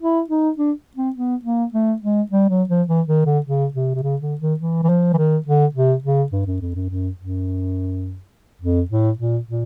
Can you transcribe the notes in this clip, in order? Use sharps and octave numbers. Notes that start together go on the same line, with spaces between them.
E4
D#4
D4
C4
B3
A#3
A3
G#3
G3
F#3
F3
E3
D#3
D3
C#3
C3
C3
C#3
D3
D#3
E3
E3
F3
E3
D#3
D3
C3
C#3
G2
F#2
F2
F#2
F#2
F#2
F2
A2
A#2
A#2